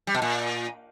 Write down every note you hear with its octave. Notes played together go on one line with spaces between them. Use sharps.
G3
B2
A#2